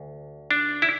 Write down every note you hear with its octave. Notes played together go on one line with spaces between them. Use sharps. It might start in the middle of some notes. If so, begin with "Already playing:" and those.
Already playing: D2
D4
E4